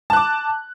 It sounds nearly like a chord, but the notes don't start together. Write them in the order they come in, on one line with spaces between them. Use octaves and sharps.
A5 F#6 D6